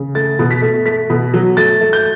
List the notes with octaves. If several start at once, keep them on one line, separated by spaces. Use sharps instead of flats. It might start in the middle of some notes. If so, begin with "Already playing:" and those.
Already playing: C#3
A3 A6
B2
B6
A3
A3 B6
B2
F#3
A3 A6
A3
G6